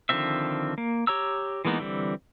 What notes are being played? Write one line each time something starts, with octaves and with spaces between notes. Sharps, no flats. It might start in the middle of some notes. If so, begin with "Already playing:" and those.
D3 D#3 F3 C4 E5
A#3
G4 C#5 A#5 E6
E3 G#3 A#3 B3 D#4
D3 E3 G3 C4